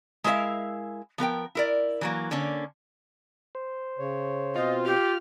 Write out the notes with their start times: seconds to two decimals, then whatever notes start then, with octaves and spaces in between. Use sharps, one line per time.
0.24 G#3 E4 A#4 B4 E5 F5
1.18 F3 B3 A#4 G5
1.55 E4 A#4 D5
2.01 E3 F#3 A#3
2.31 D3 A#3 C#4 D4
3.55 C5
3.99 C#3 C#5
4.56 B2 C4 F4 D#5
4.86 G4 F6